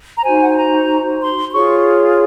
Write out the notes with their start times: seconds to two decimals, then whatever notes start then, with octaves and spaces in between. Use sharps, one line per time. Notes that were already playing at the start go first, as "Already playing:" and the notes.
0.17 A#5
0.24 D#4 F#4 C5 G#5
0.33 F5
0.41 F#5
0.49 G#5
0.56 A#5
1.21 C6
1.50 C6
1.54 F4 G#4 C#5 C#6